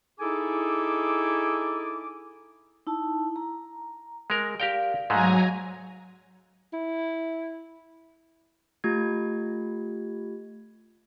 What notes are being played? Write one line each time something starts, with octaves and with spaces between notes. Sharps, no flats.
D#4 E4 G#4 A4 G#5 D6
D#4 E4 A5
A#5
G#3 A#4
G4 A#4 D5 F5 G5
G#2 F#3 G#3 A3 G#5 A#5
E4
A3 F4 G4 G#6